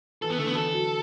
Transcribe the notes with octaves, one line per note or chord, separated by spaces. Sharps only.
E3 A4
B3
D3 A3
B3
E3 A4
F#3